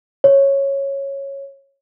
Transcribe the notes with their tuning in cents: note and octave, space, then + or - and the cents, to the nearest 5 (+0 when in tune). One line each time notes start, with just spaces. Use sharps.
C#5 -10